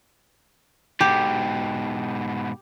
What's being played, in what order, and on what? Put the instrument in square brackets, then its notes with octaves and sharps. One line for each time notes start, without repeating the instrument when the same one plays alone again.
[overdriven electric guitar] G#2 B2 [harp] G4